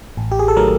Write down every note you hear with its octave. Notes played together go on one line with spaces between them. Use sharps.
A1
G4
G#4
A4
D#3 F#3 A3 A#4